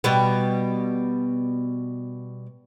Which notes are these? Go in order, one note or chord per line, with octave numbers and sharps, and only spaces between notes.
B2 G3 B3